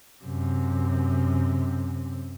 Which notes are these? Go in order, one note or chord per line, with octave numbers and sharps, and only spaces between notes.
F#2 C3